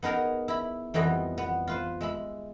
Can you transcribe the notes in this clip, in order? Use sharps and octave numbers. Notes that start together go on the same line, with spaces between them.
B3 D#4 G#4 A#4 A#5
E4 B5
F2 E3 G3 B3 D#5
B3
F4 B4 C5
G#3 E5 B5